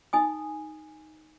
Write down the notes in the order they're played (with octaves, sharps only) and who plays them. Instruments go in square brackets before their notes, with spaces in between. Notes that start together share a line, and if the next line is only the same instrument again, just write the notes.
[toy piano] D#4 G#5 D#6